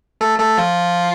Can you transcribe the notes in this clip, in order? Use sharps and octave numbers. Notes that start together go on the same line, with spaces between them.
A3 A4
A3 A4
F3 F4